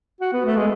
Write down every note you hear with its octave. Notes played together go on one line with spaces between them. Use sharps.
F#4
B3
A3
G#3